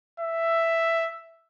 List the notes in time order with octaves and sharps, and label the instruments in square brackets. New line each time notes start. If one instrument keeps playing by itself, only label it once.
[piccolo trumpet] E5